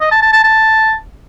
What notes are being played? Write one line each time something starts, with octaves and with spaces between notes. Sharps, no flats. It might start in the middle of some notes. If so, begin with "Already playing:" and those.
D#5
A5
A5
A5
A5